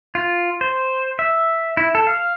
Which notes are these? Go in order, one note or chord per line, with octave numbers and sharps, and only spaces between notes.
F4
C5
E5
E4
A4
F5